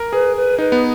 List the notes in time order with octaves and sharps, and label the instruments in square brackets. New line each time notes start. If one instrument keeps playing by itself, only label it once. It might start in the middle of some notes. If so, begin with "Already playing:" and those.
Already playing: [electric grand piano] A#4
[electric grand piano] G#4 [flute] B4
[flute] B4
[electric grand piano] D#4 [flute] B4
[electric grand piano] B3